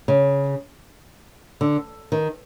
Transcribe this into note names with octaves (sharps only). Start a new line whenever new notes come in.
C#3
D3
D#3